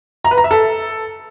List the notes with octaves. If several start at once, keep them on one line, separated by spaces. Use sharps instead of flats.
A#5
B4
A#5
E5
A4